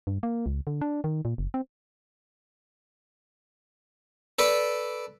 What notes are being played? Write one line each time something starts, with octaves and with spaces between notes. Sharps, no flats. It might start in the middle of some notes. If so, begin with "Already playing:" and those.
G2
A#3
C#2
D3
D4
D#3
A#2
F#1
C4
A4 B4 D5